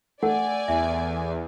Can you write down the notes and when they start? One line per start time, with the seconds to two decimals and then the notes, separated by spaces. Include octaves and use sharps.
0.23 A3 D5 F#5 G#5
0.68 E2 E5